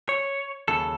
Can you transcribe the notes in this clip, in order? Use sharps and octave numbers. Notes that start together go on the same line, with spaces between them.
C#5
D#2 C#3 F#3 A4